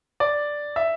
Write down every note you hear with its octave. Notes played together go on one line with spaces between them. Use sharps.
D5
E5